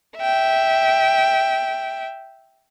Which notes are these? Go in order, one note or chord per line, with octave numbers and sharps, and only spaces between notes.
E5 G5